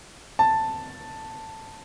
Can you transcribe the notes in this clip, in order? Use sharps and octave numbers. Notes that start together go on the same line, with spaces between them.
A5